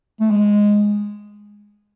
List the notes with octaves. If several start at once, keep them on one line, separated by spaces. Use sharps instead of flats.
A3
G#3